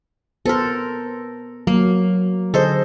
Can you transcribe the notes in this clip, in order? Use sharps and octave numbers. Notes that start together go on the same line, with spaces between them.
B3 A4 A#4 C5
F#3 A#3
D3 G#4 A4 C5 D#5